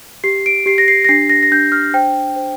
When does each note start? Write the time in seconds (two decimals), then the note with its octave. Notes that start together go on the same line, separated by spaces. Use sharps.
0.24 G4 C7
0.46 D7
0.66 G4 C7
0.78 A#6
0.88 C7
1.05 A#6
1.09 D4 C7
1.30 A#6
1.43 A#6
1.51 D4 G6
1.72 F6
1.94 C5 G5
2.36 C5